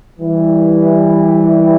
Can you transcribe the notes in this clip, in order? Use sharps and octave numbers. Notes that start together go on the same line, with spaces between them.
E3 G3